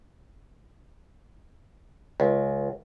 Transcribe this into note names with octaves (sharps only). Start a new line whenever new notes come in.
C#2